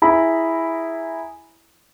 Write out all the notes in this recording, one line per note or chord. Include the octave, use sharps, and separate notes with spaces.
E4 G#4 A#5 B5